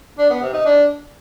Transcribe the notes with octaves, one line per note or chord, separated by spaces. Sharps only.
D4
B3
C3
D#4
D4